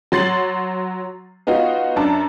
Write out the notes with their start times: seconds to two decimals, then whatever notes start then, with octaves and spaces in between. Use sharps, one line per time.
0.12 F#3 C6 A6 C7 F#7
1.47 B3 D#4 F4 F#4
1.96 F#2 D4 A5